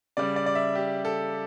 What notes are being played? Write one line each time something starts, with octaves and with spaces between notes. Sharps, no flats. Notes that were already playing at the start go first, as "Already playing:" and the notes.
C#3 G3 D5
D5
D5
E5
G4
A4